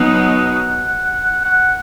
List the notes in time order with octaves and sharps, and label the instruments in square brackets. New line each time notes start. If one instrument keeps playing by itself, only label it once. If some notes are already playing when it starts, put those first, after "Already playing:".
Already playing: [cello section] B2 F#3 B3 D#4 [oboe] F#5
[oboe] F#5